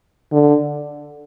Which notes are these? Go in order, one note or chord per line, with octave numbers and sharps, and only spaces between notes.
D3